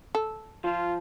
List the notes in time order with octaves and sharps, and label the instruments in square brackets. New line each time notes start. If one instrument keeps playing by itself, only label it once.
[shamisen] A4
[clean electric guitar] F3 [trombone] F4